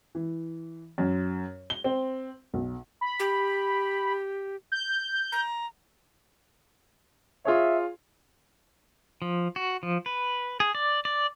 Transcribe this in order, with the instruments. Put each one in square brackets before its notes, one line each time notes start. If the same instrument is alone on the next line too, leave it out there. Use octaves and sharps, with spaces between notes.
[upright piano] E3
F#2
G7
C4
B1
[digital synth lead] B5
[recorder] G4
[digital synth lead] G6
[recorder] A#5
[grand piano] F4 G#4 C#5 [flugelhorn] E5
[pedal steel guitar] F3
F#4
F3
B4
G#4
D5
D5